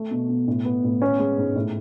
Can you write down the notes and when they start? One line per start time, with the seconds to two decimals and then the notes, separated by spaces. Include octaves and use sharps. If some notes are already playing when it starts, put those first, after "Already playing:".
Already playing: A3
0.11 B2
0.29 B2
0.48 A2
0.65 B3
0.84 A2
1.02 B3 C#4
1.19 G#3
1.38 G#2
1.56 A2